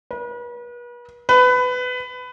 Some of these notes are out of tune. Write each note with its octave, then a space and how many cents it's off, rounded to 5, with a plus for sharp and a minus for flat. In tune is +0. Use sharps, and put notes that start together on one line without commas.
B4 -40
B4 +20